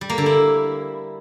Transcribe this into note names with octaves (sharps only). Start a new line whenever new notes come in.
G3
A#3
D3
E4